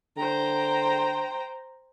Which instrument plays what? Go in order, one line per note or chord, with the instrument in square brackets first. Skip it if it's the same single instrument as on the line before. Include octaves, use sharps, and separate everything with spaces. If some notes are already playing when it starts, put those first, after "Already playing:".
[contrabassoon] D3 [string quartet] C5 G5 A#5